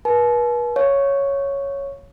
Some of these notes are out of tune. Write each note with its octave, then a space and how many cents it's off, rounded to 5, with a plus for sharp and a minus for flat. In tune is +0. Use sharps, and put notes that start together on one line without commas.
B4 -40 A5 -45
C#5 +0 F5 +0